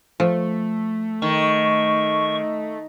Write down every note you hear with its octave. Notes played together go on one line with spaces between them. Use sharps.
F3 A3
D#3 C#6